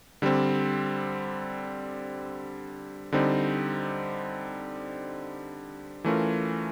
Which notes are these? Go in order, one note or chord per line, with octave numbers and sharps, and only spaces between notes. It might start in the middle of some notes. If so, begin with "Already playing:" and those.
D3 G3 C4
D3 G3 C4 D#4
E3 A3 C#4 F4 A#4